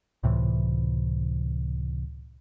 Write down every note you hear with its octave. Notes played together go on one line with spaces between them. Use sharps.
C#2 A2 C3 E3